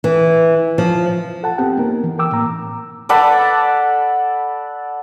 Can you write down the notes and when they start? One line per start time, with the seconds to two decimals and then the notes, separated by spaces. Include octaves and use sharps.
0.04 E3
0.78 F3
1.43 A4 F#5 A5
1.58 B3 C4 G4 F#5 G5
1.77 A#3 D#4 A#4
2.04 E3
2.19 A#4 G5 D6 E6
2.32 A2 A#3 A#5
3.09 A4 D5 F#5 B5